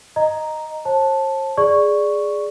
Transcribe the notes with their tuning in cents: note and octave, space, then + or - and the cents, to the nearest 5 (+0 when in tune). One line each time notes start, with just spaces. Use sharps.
D#5 -5 A#5 +0
C5 +45 A5 +0
G#4 +0 D5 -5 C#6 +0